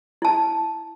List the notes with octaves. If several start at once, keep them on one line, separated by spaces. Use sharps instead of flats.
E4 A5